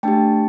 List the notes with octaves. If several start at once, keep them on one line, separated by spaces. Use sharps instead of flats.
A3 D4 G4 G5 A5